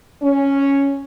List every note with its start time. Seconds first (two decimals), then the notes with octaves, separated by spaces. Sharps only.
0.23 C#4